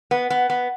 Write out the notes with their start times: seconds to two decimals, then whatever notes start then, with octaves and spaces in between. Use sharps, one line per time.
0.11 B3
0.30 B3
0.50 B3